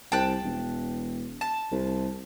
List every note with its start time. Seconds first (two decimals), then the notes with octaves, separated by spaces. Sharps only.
0.12 C2 G5 A5 F#6
0.43 E1
1.41 A5
1.72 C2